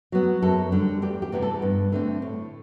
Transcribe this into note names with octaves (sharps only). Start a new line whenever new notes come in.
F#3 B3
F#2 A4
D3 G3
E2 G4
G4
C3 E3 G3 B3
A4
G2
D3 A3 C4
A2